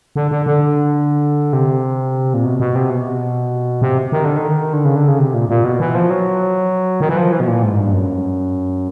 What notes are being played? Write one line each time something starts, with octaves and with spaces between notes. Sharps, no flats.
D3
D3
D3
C3
A#2
B2
B2
C3
B2
C3
D#3
D3
D#3
D3
C#3
D3
C#3
C3
A#2
A#2
B2
E3
F3
F#3
D#3
E3
F3
E3
B2
A#2
G#2
G2
F#2